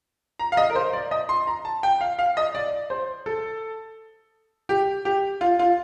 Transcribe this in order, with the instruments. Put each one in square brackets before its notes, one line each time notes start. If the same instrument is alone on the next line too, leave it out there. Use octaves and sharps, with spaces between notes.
[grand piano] A#5
F5
D#5
A#4
C5
D5
D#5
C6
A#5
A5
G5
F5
F5
D#5
D5
C5
A4
G4
G4
F4
F4